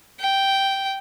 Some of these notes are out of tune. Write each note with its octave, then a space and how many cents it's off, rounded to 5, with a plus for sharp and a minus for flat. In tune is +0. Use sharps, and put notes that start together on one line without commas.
G5 -5